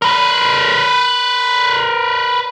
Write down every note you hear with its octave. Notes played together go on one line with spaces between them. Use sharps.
A#4 B4